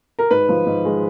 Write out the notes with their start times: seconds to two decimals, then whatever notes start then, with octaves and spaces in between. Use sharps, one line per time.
0.19 A#4
0.31 G#2 B4
0.49 F3
0.66 G#2
0.85 G#3